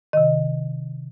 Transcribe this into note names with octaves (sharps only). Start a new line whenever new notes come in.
C3 D#3 D#5